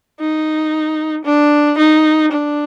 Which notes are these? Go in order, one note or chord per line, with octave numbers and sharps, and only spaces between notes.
D#4
D4
D#4
D4